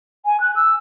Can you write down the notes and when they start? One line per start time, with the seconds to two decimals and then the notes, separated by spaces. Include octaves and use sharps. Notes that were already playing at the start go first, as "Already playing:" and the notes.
0.24 G#5
0.40 F#6
0.56 E6